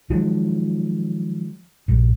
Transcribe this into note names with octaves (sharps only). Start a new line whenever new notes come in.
D#3 F3 F#3 G#3
A#1 G2